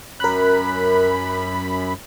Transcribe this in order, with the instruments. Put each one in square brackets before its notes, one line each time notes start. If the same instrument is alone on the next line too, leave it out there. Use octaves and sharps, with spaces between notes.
[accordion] F#2 B5 [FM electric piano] A#4 F#6